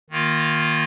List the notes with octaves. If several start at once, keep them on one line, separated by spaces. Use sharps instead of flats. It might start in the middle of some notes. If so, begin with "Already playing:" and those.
D#3 A#3 F4